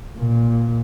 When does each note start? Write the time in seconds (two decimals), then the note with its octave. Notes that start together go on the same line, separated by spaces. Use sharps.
0.18 A#2